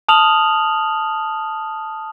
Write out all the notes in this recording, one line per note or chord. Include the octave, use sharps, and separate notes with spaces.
A5 D#6 F6 F7 F#7